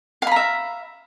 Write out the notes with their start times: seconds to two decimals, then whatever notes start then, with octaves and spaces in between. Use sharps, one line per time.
0.22 F5
0.27 B5
0.32 A#5
0.36 E5